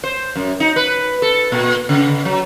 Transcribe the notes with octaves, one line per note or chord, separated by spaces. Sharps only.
C5
F#2
D#4
B4
A4
A#2
C#3
F#3